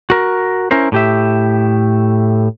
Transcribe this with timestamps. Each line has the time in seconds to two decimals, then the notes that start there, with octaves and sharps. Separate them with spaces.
0.10 F#4 A#4
0.71 C#4 E4 A#4 C5
0.92 A2 G4 E5